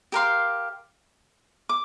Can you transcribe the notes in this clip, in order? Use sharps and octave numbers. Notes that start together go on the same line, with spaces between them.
G4 A#4 F5 C6
D6